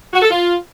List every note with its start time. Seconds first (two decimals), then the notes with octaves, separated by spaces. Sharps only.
0.14 F#4
0.22 A4
0.31 F4